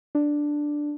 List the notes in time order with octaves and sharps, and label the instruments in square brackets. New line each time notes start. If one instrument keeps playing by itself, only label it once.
[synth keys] D4